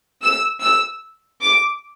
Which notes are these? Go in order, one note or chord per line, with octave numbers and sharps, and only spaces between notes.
E6
E6
D6